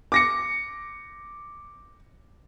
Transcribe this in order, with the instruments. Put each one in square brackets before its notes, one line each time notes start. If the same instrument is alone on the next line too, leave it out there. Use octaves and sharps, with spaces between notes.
[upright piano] D6 A#6 C#7